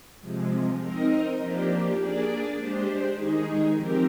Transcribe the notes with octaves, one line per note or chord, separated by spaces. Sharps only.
C3 F3 G#3
C4 D#4 A#4 D#5
F3 A#3 D4 G4
A#3 D4 G#4 D5
G#3 D4 G4 C5
D#3 G#3 D#4 G#4
F3 C4 G4 A#4